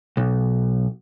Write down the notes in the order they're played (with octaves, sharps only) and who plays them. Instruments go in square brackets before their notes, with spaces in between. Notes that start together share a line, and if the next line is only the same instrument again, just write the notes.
[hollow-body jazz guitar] B1